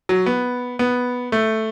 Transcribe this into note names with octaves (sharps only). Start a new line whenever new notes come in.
F#3
B3
B3
A3